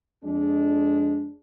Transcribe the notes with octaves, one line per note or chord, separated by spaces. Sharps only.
F2 G#3 D4